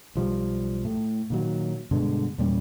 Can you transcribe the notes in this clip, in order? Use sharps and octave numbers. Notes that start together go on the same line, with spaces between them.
B1 F3 G3
A2
A#2 D#3 F#3
G2 B2 D3 G#3
E2 A#2 G3 C#4